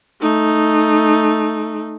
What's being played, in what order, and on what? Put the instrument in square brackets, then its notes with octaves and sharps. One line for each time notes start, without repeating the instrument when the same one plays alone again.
[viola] A3 D#4